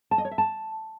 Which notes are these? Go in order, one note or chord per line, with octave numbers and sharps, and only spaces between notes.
A5
D#5
C#5
E5
A5